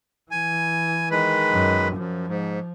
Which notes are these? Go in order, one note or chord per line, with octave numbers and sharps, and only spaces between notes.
E3 G#5
D#3 G#3 B4
F#2
F#2 F3
G#2